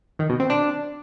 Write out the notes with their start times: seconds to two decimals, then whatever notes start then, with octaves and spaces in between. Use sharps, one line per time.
0.19 D#3
0.29 B2
0.40 C4
0.50 D4